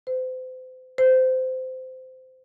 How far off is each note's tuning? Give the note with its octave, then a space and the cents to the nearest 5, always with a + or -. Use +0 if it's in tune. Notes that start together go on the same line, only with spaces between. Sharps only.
C5 -35
C5 -20